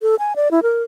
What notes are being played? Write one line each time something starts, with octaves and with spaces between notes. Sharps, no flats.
A4
G#5
D5
E4
A#4